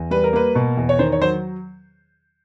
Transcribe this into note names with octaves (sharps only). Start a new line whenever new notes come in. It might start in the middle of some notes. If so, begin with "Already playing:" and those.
Already playing: E2
G3 B4
A#4
A#3 B4
B2
E2
C#5
D#3 C5
C#5
F#3 C5